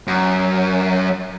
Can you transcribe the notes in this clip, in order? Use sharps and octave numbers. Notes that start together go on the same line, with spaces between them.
F#2